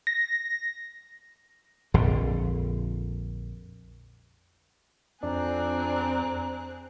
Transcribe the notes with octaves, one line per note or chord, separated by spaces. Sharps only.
A#6
A#1 F2 D3
F2 C4 D4 G#4 A#5 F#6